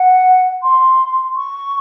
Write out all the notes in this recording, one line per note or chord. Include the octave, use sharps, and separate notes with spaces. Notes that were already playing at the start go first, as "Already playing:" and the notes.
Already playing: F#5
C6
C#6